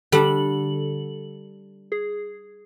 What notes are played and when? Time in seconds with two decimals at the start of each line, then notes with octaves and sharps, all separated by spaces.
0.12 D3 G3 D4 A4 F#7
1.92 G#4